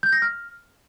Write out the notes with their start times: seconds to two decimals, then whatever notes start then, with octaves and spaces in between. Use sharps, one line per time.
0.03 G6
0.13 A#6
0.22 F6